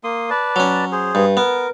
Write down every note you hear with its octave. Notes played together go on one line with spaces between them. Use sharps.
A#3 C6 D#6
B4 D5 A5
F#3 C#4
G#4 C5
G2
B3 A#4